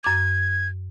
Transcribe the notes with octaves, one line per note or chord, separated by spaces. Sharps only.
F#2 D6 G#6